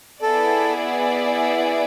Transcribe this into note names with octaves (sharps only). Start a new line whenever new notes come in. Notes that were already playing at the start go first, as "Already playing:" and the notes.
B3 E4 G#4 A4 D5